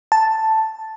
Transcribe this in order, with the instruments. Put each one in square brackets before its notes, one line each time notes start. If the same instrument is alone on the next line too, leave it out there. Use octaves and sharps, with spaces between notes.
[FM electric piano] A5